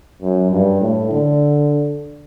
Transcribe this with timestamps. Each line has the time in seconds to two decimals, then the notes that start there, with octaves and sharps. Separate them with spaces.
0.22 F#2
0.52 G2
0.81 A2
1.11 D3